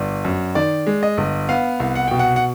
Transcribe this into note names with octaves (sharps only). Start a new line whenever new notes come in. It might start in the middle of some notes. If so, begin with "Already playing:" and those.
Already playing: G1 D5
F#2
D#3 D5
G#3
D#5
G1
B3 F5
C2
F#5
B2 G5
F#5
F#5